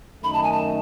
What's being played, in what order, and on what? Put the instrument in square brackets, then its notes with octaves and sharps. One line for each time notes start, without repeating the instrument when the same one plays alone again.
[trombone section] F#2 D#3 A3 D#4 [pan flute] B5
[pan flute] A5
G#5
A5